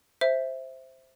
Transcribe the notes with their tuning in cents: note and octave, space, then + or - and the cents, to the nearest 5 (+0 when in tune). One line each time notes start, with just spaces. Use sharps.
C5 +0 E5 +0